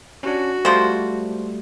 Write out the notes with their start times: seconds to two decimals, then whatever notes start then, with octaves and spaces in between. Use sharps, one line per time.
0.23 C#4 D4 F#4
0.65 F3 G3 A3 C5